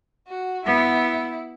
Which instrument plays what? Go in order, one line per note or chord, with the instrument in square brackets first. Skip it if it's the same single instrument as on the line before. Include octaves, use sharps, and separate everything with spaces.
[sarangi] F#4
[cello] B3 [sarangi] E4